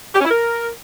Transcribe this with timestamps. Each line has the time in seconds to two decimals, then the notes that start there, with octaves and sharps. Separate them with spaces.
0.15 G4
0.20 C#4
0.25 E4
0.30 A#4